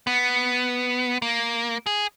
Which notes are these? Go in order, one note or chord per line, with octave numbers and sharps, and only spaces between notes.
B3
A#3
G#4